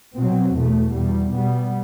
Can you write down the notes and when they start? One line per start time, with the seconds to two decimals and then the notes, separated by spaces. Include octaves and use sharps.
0.16 B2 F#3 C4
0.54 E2 B2 A3
0.93 E2 B2 G3
1.30 B2 G3 B3